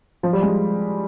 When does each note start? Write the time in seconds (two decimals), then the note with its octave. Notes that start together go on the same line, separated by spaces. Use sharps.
0.23 F3
0.33 G3
0.43 G#3